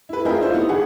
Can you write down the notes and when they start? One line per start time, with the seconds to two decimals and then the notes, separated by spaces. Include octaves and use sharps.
0.09 E4 B4
0.25 C4 F4 G#4 A#4 D#5 E5
0.40 D4 E4 F4 C5
0.53 B3 D#4
0.69 G1 G#4 F#5